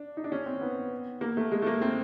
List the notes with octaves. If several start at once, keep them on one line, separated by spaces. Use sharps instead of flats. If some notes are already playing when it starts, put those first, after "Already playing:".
Already playing: D4
D#4
D4
C#4
C4
B3
A#3
A3
G#3
A3
A#3
C4